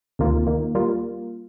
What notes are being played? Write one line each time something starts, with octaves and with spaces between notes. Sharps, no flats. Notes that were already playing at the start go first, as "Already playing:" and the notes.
D2 C3 D#3 A#3 F4
D#2 D#3 A#3
G3 A#3 F4